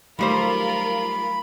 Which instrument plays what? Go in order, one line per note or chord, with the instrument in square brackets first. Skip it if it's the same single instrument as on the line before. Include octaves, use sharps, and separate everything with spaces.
[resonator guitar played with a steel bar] D#3 G3 C5 [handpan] F#3 A3 [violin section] F4 A#4 [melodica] B5